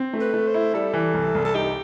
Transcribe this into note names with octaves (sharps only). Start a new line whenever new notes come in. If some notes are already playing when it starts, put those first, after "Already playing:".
Already playing: C4
A3
B4
A3
C5
E4
G3 A4
E3
C2
C2
A4
D#4 G4